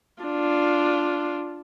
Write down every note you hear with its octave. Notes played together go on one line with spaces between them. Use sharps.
D4 F4